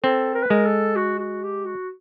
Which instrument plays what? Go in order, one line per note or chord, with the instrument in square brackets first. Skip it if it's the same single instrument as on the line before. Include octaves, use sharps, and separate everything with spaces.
[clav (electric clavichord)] C4 [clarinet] A4
[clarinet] A#4
B4
[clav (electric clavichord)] G#3 [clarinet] A#4
[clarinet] A4
F#4
F#4
G4
F#4